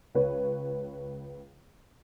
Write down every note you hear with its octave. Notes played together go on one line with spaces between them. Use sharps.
C#2 B4 C#5